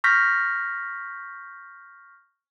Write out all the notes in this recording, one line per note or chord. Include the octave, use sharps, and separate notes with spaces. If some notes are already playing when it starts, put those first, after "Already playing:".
C#6 F6 G6 A#6 B6